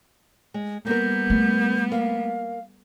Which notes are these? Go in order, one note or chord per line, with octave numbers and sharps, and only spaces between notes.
G#3
G3 A#3 B3 A#4 G6
A3
A#3 F5